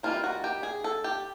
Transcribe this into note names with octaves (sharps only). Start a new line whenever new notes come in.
E3 G3 A#3 D#4 F4
F#4
G4
G#4
A4
G4